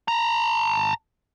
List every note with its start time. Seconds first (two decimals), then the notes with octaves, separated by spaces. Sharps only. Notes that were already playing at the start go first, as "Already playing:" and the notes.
0.08 A5 A#5